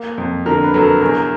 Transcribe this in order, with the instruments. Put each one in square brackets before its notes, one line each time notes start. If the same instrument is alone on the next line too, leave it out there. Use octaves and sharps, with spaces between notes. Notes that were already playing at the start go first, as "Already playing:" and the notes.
Already playing: [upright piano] A#3
F2
[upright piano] D3 [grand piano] A#4
[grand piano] B4
[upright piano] F#3 [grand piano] A4
[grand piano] A#4
[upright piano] E2 [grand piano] A#4